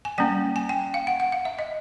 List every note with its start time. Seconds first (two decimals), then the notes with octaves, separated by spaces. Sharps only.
0.05 G#5
0.18 G3 A#3 C#4 G5
0.56 G#5
0.69 G5
0.94 F5
1.07 F#5
1.20 F#5
1.32 F5
1.45 E5
1.59 D#5